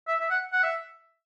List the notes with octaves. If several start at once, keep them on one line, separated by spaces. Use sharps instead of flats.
E5
E5
F#5
F#5
E5